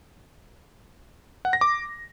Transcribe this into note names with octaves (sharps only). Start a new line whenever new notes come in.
F#5
A#6
D6